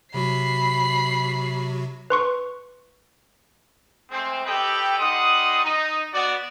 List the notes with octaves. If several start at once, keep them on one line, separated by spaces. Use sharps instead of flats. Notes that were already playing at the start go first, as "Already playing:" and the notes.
C3 F#3 F#4 B5 C7
B4 C6 C#6
G#3 A3 C4
G4 A4 B4 D#5 G5
G3 D#4 F#5 C6 D#6
D#4
B3 F#4 D5